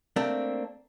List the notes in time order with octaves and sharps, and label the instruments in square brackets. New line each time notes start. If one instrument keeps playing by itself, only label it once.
[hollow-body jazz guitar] A3 A#3 C4 D4